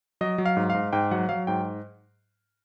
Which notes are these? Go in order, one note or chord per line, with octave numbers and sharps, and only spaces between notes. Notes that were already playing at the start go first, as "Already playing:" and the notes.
F#3 D#5
F#3
F5
G#2
G#2 F5
G#2 G5
F#3 F#5
F#3 F5
G#2 G5